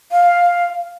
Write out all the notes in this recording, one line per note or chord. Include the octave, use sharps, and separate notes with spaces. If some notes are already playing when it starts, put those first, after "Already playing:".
F5